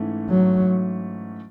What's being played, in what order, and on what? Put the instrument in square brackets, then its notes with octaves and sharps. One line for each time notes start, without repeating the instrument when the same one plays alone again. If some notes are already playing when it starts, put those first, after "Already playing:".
Already playing: [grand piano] G#2 E3 A3 C#4
[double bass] F#3